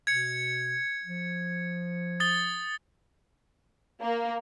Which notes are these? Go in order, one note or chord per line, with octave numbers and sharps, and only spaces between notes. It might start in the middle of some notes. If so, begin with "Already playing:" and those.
B2 G#6 C#7
F3
D#6 A6 G7
A#3